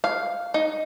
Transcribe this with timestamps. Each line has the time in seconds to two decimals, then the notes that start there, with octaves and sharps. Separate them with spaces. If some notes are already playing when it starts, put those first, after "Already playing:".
0.04 F5
0.54 D#4